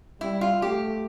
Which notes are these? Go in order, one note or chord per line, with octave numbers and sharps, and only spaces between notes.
G3 E4
F4
A3 G4